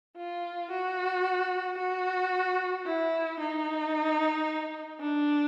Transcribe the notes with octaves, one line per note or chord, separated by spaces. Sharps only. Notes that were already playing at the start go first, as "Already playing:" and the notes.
F4
F#4
F#4
E4
D#4
D4